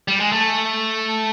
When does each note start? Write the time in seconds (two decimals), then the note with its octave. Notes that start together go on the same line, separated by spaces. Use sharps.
0.08 G3
0.20 G#3
0.32 A3